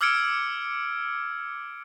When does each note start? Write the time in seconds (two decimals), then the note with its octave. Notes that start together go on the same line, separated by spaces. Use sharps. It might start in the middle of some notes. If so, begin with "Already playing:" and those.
0.01 D6 E6 F6 G#6 C#7 D7